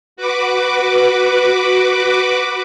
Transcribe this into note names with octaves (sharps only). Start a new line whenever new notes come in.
F#4 B4 D6